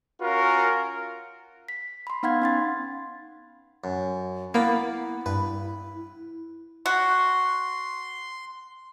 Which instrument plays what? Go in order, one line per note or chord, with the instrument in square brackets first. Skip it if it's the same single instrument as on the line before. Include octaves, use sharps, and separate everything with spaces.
[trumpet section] C#4 F4 F#4 A#4
[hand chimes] B6
B5 C6
B3 D#4 F5 F#5 B5 G#6
C#4 C6 A6
[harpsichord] F#2
[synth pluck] A#3 [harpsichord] B3 D5 B5 [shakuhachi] E4
[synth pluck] G2 [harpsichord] B4
[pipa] F#4 [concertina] C6